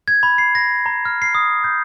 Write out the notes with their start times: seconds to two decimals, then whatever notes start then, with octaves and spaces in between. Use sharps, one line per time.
0.08 G#6
0.23 B5
0.38 C7
0.55 A#6
0.86 A#5
1.05 F6
1.22 C7
1.35 D#6
1.64 G6